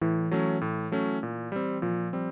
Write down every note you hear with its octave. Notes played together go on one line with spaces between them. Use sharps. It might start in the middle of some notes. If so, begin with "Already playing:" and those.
A2 E3
F#3 A3 C#4
A2
F#3 A3 C#4
A#2
G3 C4
A#2 F3
G3 C4